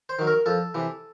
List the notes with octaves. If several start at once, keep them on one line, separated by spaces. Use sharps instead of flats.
C5
D#3 F#3
A#4
F2 A4
C3 E3